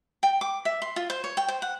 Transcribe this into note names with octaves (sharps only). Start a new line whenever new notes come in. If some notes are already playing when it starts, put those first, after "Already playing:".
G5
D6
E5
C6
F4
C5
C#5
G5
C5
F#5